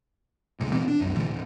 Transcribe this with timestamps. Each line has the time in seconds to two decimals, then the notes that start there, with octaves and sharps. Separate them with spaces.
0.60 D2 C3 G#3
0.72 B2 E3 C4
0.88 D4
1.00 C2 F#2
1.15 A#2 D3 E3 A3
1.29 D1